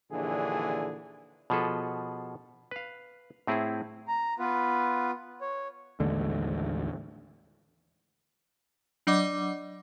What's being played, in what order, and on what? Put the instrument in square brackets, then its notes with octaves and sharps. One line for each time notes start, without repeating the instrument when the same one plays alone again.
[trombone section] A#1 D#2 D3 E3 D4 G#4
[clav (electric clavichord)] B2 F3 G#4 A4 B4
B4 F5
A2 C4 E4 G#4
[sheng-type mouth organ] A#5
B3 F4 B4
C#5
[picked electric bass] A1 D#2 D3 G#3
[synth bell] F#3 D4 D5 D#5 F#5 D6